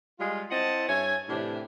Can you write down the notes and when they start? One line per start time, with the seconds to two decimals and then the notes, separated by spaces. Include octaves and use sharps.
0.19 G3 G#3 F4
0.50 C4 E4 D#5 F#5 A5
0.88 G2 C#5 E5 G#5
1.29 A2 C3 E3 D4 G4